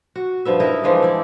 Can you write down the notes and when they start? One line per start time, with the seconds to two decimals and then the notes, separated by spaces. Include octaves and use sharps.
0.16 F#4
0.45 G2 F3 B3 E5
0.60 D#4 E4 A#4 D#5
0.84 E3 F3 G#3 D4
1.03 E4 D5